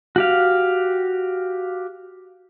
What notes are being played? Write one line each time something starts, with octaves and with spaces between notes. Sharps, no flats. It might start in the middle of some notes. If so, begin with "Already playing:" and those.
F#4 G4 F5